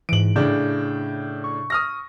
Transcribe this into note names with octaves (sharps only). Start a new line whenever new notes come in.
G#2 E3 D7 F#7
A2 C#3 D4 G6
C#6
D#6 F6 A#6